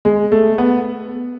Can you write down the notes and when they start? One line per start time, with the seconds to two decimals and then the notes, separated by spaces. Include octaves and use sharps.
0.05 G#3
0.32 A3
0.58 B3